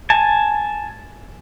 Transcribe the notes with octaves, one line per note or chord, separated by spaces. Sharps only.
G#5 A5